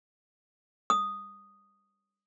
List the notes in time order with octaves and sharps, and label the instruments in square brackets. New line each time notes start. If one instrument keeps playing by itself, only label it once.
[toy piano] D#6